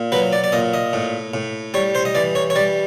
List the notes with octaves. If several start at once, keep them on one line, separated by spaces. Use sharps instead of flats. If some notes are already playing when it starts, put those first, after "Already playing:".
Already playing: A#2
F#3 B4
D5
D5
A#2 D#5
D#5
A2
A2
G3 C#5
C5
D#5
E3 D5
C#5
C#5
G3 D5